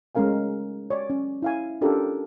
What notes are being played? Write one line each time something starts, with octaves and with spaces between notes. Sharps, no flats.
G#3 A3 C#4 A#4 F5 G#5
C#5 D5
C#4
E4 F5 G#5
C#4 D4 F4 G4 A4 A#4